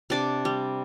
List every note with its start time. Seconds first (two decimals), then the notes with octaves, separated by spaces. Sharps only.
0.10 C3 D4 D6
0.45 G3